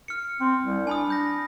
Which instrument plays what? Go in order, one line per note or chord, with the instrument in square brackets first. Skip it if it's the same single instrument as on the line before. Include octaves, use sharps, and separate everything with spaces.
[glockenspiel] F6 C#7
[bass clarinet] C4
C2
[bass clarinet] D4 [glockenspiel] G#5 B5 D#6
[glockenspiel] G6 A#6